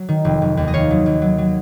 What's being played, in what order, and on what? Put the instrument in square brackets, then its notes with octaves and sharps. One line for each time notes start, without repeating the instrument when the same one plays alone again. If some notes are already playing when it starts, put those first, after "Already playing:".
Already playing: [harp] F#3
D#3
F1
F1
D#2
D#5
D#3 C#5 F5
F#3
D#2
F#3
F#3